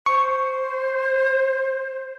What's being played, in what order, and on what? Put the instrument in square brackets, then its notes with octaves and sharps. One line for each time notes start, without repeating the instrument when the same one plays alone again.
[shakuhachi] C5 [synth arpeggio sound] C#6